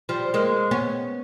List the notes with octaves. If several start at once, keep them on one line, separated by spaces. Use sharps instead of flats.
F3 G3
G#3 A#3
B3 C#4